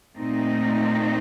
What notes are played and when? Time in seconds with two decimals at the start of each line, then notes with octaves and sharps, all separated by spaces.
0.17 A#2 A3 C4 D#4